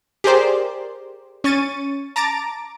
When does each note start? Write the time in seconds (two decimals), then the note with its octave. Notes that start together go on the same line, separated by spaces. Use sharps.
0.24 G4 G#4 A#4 C5 D5
1.44 C#4 C#6 A6 D#7
2.16 A5 A#5 D6 A6 D7